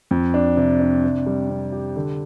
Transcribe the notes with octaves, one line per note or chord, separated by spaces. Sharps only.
F2
D4
C3
D4
C3
G3
C3
G4
D3